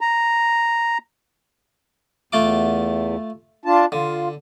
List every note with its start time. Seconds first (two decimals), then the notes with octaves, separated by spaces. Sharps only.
0.01 A#5
2.33 E2 A3 F4 D6
3.65 D4 F4 A5
3.92 D3 F4